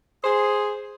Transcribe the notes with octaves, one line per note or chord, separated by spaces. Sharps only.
G#4 C5